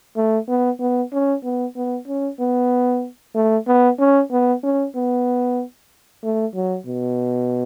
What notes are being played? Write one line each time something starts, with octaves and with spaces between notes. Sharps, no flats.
A3
B3
B3
C#4
B3
B3
C#4
B3
A3
B3
C#4
B3
C#4
B3
A3
F#3
B2